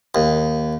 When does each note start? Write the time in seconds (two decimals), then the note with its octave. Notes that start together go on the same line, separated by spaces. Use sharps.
0.15 D#2